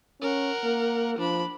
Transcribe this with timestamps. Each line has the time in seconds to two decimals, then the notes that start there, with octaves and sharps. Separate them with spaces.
0.22 C#4 A#4 F#5
0.64 A#3
1.18 F3 D4 B5